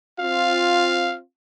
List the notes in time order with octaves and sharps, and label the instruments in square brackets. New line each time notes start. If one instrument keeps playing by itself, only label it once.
[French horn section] C4 F4 [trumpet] F5